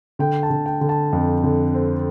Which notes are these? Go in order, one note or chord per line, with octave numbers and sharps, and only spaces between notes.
D3 G5
A5
D3
G5
D3
A5
F2
D3
C4